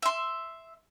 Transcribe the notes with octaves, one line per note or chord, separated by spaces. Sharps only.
E5 C6